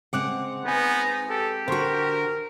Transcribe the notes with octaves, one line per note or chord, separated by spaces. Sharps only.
C#3 G#3 C4 F#5 D6 F#6
B3 D#4 B4 G#5
G4 A4
D3 F#4 A#4 C5 C6 C#6